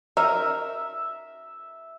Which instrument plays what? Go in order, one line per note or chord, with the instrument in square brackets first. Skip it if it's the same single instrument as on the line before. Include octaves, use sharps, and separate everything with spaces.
[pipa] D#4 A#4 [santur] E5